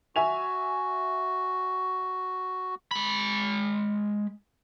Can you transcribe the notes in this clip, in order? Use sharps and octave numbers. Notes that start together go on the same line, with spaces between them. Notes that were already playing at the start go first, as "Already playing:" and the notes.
F#4 E5 G#5 F7
G#3 B5